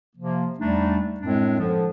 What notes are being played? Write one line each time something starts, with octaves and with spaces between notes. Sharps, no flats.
C3 F3 A#3
E2 G3 A3 D4 D#4
F#2 A2 G#3 C4 D4
D3 F3